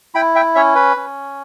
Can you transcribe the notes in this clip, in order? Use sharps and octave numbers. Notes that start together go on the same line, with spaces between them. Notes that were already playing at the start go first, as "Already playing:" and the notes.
E4 G5 B5
E5 G5
C#4 C#5 E5
B4
C#4